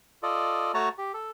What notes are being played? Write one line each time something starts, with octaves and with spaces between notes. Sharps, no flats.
F4 A4 D5 D#5
A3 F#4 C#5 A5 A#5
G4
A4